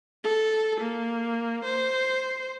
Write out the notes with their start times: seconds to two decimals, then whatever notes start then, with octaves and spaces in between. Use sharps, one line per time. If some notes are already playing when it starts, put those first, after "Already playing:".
0.24 A4
0.81 A#3
1.65 C5